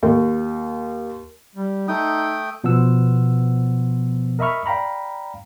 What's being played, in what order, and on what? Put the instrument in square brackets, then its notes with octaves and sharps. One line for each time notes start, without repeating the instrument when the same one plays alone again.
[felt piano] D#2
[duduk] G3
[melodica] A3 G5 D#6 [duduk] D#4
[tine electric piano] B2 F3 B3 C5 F#5 E6
A#4 D#5 E5 B5 C#6 F6
D5 F5 G5 A#5 B5